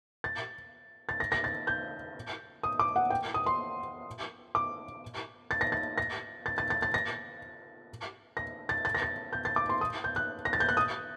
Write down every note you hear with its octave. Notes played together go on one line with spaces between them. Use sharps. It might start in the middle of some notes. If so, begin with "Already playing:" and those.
A6
A6
A#6
A#6
A6
G6
D#6
D6
F#5
G5
D#6
C6
D6
A6
A#6
A6
A#6
A6
A6
A6
A6
A#6
A#6
A6
A6
A#6
A6
G6
A6
D6
C6
D#6
G6
F#6
A#6
A6
G6
F#6
D#6